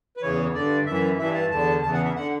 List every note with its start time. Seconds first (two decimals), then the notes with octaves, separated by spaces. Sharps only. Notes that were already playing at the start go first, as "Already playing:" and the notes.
0.17 B4
0.22 E2 C#3 E3 C#5
0.54 G2 D3 D5
0.86 F#2 E3 E5
1.18 G2 E3 E5
1.35 A5
1.51 E2 D3 A5
1.83 E2 C#3 E3 A5
1.94 F#5
2.05 E5
2.15 D3 F#5